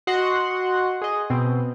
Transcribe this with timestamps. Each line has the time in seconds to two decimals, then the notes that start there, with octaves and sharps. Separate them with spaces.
0.07 F#4 D#5 F#5 C6
1.01 G#4 D#5
1.30 B2 C4